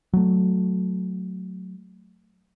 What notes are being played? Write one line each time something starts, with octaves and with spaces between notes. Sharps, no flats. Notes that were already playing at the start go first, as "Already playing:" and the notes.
F#3 A3